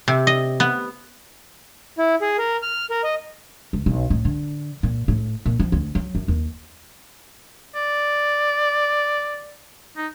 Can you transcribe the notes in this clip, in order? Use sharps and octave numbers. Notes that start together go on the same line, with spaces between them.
C3
D#5
B3
E4
G#4
A#4
F6
A#4
D#5
C#2
B1
A2
D3
A#2
A2
A#2
F3
D2
F#3
F#2
D#2
D5
D#4